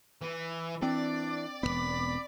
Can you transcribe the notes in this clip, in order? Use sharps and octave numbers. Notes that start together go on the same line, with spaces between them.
E3
E3 C4 D4 D5
E1 F#2 B3 B5